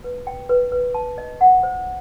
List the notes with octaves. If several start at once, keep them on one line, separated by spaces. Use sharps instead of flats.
B4
G5
B4
B4
A5
D#5
F#5
C5